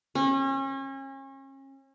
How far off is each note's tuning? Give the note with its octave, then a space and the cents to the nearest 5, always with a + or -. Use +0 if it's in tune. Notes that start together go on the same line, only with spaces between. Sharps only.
C#4 -35